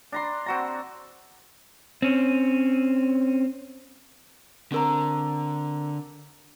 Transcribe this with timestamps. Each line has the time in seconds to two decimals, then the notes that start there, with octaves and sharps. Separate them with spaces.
0.12 D4 A#5 C6
0.46 C4 F#4 A#5
2.02 C4 C#4
4.72 D3 C4 A#4 A#5